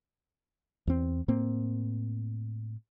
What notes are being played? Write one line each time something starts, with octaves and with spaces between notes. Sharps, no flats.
E2 C4
A2 A#3 C4